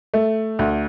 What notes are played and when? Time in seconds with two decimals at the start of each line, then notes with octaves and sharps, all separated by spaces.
0.14 A3
0.59 D2